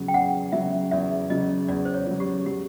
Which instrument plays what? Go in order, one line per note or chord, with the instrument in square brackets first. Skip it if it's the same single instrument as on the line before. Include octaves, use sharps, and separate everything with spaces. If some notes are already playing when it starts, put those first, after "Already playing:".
Already playing: [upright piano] E2 C#3 F#3
[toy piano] G5
[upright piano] E2 [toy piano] F#5
[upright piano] C#3 F#3 [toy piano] E5
[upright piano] E2 [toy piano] E5
[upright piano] C#3 F#3 [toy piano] D#5
[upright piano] E2 [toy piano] D5
[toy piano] C5
C#5
[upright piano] C#3 F#3
[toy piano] G4
[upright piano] F#3 [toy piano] G4